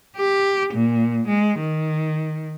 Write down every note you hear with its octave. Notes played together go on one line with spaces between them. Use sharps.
G4
A#2
G#3
D#3